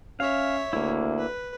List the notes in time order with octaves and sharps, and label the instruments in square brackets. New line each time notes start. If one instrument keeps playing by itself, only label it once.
[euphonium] C#4 [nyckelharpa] C#5 E5 [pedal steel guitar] F5
[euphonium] D2 [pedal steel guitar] A#3 E4
[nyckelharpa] B4